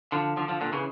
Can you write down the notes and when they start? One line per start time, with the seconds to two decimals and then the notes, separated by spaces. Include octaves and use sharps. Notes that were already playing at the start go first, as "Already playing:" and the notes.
0.12 D3 F3
0.37 D3 F3
0.48 D3 F3
0.61 A#2 D3
0.72 C#3 E3